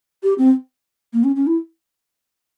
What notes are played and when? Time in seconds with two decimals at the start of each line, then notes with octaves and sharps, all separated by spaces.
0.23 G4
0.38 C4
1.13 A#3
1.24 C#4
1.36 C#4
1.47 E4